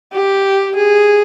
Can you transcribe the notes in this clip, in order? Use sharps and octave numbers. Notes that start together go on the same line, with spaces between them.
G4
G#4